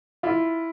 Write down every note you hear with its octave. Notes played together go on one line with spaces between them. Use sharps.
E4 F4